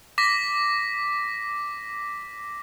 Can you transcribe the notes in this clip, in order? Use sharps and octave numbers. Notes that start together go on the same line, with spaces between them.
D6 A#6 B6